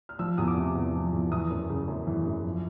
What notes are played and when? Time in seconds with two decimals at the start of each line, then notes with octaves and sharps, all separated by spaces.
0.09 F6
0.19 F3 E6
0.38 E2 D#6
0.48 D6
0.57 C3
0.76 E2
0.94 F3
1.12 E2
1.32 E3 D#6
1.50 F#2
1.69 C#3
1.88 F#2
2.07 E3
2.25 F#2
2.45 F3